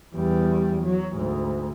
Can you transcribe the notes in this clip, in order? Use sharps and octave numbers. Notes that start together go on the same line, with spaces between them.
E2 G3
F#3
D2 G#2